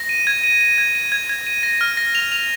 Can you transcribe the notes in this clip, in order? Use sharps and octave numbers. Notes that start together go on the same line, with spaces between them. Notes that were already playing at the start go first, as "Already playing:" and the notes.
Already playing: A#6
D#7
G#6
D#7
D#7
G#6
D#7
G#6
G#6
D#7
A#6
F6
A#6
F7
F7